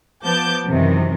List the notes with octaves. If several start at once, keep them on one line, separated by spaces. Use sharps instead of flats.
F3 B3 A5 D6 G6
F#2 C3 D#3 E3